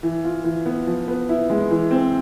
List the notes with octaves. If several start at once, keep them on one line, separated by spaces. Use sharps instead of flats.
E3
F4
E3
B3
F3
B3
E4
G#3
E3
C4